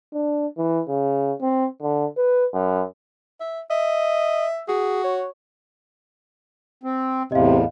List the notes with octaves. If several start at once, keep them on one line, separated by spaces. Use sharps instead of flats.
D4
E3
C#3
C4
D3
B4
F#2
E5
D#5 E5
F#4 G#4
C#5
C4
E2 A2 C3 D#5 F5